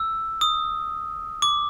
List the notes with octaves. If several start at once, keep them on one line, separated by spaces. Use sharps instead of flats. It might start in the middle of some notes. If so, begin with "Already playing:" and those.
Already playing: E6
D#6
D6